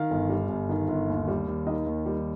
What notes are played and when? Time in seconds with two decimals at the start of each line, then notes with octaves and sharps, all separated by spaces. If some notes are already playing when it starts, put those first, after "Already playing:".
Already playing: D#3 F5
0.10 G1
0.29 G3
0.49 G1
0.69 D#3
0.88 G1
1.08 D#2
1.28 G3
1.47 D#2
1.67 D#3 D#5
1.86 D#2
2.06 G3